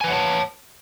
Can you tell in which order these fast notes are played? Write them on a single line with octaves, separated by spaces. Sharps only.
G#5 B4 F#5 C#5 A5